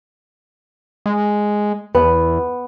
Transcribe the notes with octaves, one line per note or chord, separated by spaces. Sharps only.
G#3
E2 B3